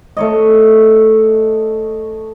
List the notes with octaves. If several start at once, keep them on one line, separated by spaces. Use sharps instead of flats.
A3 C#5 D#5